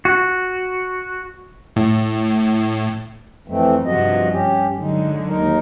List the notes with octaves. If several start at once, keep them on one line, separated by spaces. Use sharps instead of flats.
F#4
A2
F2 E3 A3 C4
G2 C3 F3 F#4 D#5
G2 C#4 G4
D3 F#3 G#3 D#4
D#2 D#4 A#4